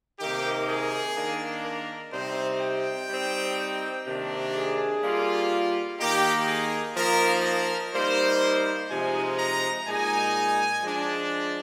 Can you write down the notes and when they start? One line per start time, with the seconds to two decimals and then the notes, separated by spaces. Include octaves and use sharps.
0.20 C3 D#3 A#3 D#4 G4
0.68 G#4
1.17 D#3 A#3 D4
1.65 A#4
2.13 C3 G3 C4 D#4 C5
2.61 G5
3.10 G3 C4 D#4
4.06 C3 D#3 A#3 D4
4.55 G#4
5.03 G3 A#3 F4
6.00 D#3 A#3 D#4 G4
6.48 G#4
6.97 F3 A#3 D#4 A#4
7.45 A#4
7.93 G3 A#3 D#4 C5
8.90 C3 F3 G#3 D#4 G#5
9.39 A#5
9.87 A#2 G#3 D#4 G#5
10.83 F3 G#3 D4